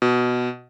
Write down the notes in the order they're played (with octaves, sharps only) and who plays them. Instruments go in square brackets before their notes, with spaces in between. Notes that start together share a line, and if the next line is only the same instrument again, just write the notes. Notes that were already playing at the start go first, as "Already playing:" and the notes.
[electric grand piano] B2